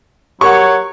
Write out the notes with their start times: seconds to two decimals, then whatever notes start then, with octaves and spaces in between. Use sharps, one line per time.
0.41 F#3 G4 A#4 C#5 F#5 C#6